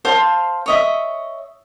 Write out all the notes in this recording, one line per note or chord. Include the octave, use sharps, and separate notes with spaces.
C5 F5 A5 C6
C#5 D#5 E5